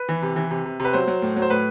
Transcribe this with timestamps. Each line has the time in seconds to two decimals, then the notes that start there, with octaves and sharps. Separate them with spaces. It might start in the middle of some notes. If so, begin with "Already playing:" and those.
Already playing: B4
0.09 E3
0.22 C3
0.36 E3
0.51 C3
0.65 C3
0.80 C3 B4
0.93 F#3 C5
1.07 F#3
1.22 A2
1.36 F#3
1.42 C5
1.50 A2 B4